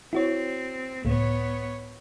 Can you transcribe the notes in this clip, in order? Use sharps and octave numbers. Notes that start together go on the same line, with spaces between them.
C4 E4 F#4 C#5
C#2 A2 B3 C#5